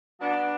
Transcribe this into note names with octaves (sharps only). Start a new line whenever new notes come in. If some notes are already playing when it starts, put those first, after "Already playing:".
F#3 B3 D4